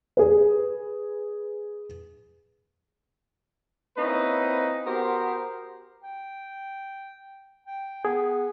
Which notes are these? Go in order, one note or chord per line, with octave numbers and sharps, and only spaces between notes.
G#4 B4
A#3 C4 C#4 D#4 E4 B4
B3 F#4 G4 A#4 C5
G5
G5
B3 G#4